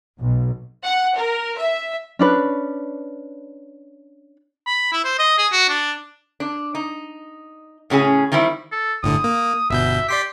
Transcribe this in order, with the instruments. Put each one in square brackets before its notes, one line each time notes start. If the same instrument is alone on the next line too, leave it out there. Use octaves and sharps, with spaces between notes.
[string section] B1
[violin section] F#5
A#4
E5
[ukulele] C#4 D4 B4
[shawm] B5
E4
C5
D#5
G#4
F#4
D4
[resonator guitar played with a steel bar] D4
D#4
A2 C#3 C#4 G#4
D#3 G3 C4 E4
[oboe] A4
[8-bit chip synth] G1 A2 D3 [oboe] D#6
[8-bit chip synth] A#3
[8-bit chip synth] G1 B2 G6 [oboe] E5
[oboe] G4 [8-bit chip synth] D5 C6 B6